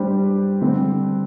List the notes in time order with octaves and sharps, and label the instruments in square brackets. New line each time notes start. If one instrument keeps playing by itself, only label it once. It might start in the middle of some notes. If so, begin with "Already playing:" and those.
Already playing: [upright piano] G3 D4 G4 C5
D3 G3 C4